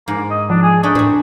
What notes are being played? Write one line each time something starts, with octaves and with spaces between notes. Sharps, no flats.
G#2 A#3
D#5
F3 D4
G#4
A3 D4 D#4 G5
A2 C4 G#4